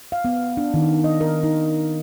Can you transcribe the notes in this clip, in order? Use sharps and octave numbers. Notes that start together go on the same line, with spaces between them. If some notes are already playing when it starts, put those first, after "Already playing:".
F5
B3
D4
D#3
D#5
A#4
D#4